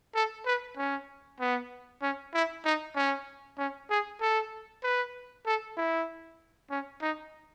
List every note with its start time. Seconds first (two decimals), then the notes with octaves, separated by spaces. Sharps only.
0.15 A4
0.46 B4
0.77 C#4
1.40 B3
2.02 C#4
2.34 E4
2.65 D#4
2.96 C#4
3.58 C#4
3.90 G#4
4.21 A4
4.84 B4
5.46 A4
5.77 E4
6.70 C#4
7.02 D#4